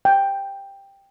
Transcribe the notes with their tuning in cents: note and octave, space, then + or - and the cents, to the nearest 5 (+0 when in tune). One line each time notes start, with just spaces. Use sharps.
G5 +10